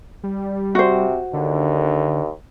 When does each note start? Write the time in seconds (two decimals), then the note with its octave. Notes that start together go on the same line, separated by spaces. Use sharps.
0.23 G3
0.75 C3 F#4 C5
1.33 D#2 D3